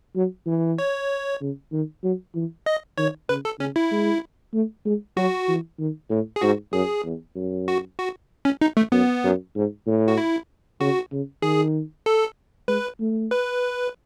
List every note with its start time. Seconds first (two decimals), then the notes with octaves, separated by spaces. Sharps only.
0.16 F#3
0.46 E3
0.78 C#5
1.41 C#3
1.72 D#3
2.03 F#3
2.35 E3
2.66 D#5
2.98 D#3 C#5
3.29 C#3 B4
3.45 A4
3.60 C#3 C#4
3.76 E4
3.92 G#3
4.53 A3
4.85 G#3
5.17 F#3 F#4
5.48 E3
5.79 D#3
6.10 A2
6.36 G#4
6.41 G#2 F#4
6.73 F#2 G#4
7.04 E2
7.35 F#2
7.68 F#4
7.99 F#4
8.45 C#4
8.61 D#4
8.77 A3
8.92 F#2 B3
9.24 F#2
9.56 G#2
9.87 A2
10.08 F#4
10.18 E4
10.81 C#3 F#4
11.12 C#3
11.42 D#3 G#4
12.06 A4
12.68 G#3 B4
13.00 A3
13.31 B4